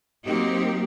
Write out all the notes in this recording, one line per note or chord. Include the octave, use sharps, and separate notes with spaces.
F#3 A#3 C4 D#4 G4